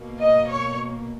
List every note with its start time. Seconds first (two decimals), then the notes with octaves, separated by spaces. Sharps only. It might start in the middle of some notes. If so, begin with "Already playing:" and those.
Already playing: B2 A#3
0.20 D#5
0.49 C#5